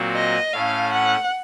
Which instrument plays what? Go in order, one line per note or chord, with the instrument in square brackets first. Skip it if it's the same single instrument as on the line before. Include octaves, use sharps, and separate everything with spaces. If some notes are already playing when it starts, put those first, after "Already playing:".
Already playing: [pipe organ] A#2 F#3 C4 F#4
[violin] D#5
[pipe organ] A2 A3 C#4 [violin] F5
[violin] F#5